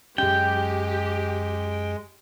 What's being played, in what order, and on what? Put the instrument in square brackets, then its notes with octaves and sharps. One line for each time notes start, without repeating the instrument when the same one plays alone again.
[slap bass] F#2 C#4 [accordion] G#3 [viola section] G4 [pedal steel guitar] G5